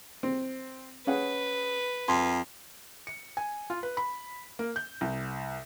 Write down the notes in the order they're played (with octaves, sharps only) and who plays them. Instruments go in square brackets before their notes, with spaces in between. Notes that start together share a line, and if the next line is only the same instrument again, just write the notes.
[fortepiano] C4
[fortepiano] C#4 G#4 F#5 [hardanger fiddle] B4
[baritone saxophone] F2 [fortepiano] C6
[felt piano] C#7
G#5
F4
B4
B5
A#3
G6
C2